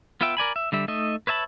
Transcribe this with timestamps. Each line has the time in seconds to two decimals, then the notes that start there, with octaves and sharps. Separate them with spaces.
0.21 B3 F4 B4 E5 G5
0.37 A#4 D5 G#5 B5
0.56 E5
0.72 D3 G3 E5
0.88 A3 D#4 D#5 E5
1.27 B4 C#5 E5 A5 B5